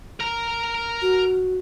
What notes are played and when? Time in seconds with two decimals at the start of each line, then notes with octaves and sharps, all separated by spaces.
0.20 A#4 A#5
1.02 F#4